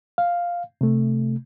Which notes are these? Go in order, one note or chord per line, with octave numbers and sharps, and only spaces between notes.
F5
C3 A3